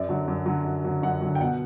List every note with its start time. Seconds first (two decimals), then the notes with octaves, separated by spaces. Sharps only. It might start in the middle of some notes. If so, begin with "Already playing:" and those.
Already playing: F#2 D5
0.09 D3 F#3
0.28 F#2
0.46 D3 F#3
0.65 F#2
0.84 D3 F#3
1.02 F#2 F#5
1.21 D3 F#3
1.35 G5
1.41 B2 F#5